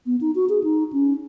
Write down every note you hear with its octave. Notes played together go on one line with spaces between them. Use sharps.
B3
D#4
F#4
G#4
D#4
C#4